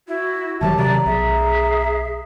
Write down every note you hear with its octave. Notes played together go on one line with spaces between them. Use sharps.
E4 F#4
E1 D#3 F#3 G4 E5 A5
C3 D#3 F#3 D5 A#5
B1 G#4 E5